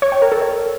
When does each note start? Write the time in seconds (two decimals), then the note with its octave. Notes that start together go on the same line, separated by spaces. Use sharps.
0.02 C#5
0.12 G5
0.22 A#4
0.32 A4
0.42 C#5